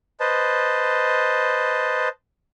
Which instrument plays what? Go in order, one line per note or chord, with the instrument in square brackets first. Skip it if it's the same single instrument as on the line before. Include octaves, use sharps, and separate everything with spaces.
[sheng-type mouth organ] B4 C5 D#5 A5